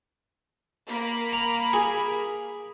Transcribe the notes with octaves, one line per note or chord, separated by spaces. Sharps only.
A#3 B5
A#5
G#4